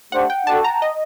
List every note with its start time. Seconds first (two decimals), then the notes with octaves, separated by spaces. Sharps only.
0.12 A3 D4 G4 C5 F#5
0.30 G5
0.47 D4 F#4 A4 A5
0.64 A#5
0.82 D#5